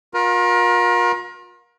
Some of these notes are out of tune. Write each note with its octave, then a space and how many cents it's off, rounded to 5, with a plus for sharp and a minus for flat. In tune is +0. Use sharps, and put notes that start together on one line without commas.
F4 +40 A#4 +30